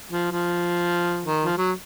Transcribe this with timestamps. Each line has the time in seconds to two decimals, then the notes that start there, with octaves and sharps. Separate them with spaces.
0.12 F3
0.31 F3
1.26 D#3
1.44 F3
1.58 F#3